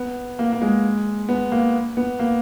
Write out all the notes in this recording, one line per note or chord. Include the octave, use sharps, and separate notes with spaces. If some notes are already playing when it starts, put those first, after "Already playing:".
Already playing: B3
A#3
A#3
G#3
B3
A#3
B3
A#3